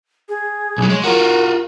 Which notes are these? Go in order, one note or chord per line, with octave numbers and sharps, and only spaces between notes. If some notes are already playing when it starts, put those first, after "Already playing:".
G#4
B1 F#3
G#3 C#5
F4 F#4 A#4